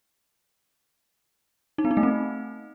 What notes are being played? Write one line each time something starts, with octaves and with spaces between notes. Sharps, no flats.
D#4
B3
D#4
A3
C4